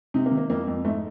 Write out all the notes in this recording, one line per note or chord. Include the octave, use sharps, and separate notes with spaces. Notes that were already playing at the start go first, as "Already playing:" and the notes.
C3 D#4
A#3
D#3
A#3
F2 A#3
F2
G#2 A3